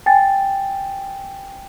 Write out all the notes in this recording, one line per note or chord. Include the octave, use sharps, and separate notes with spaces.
G5 G#5 A6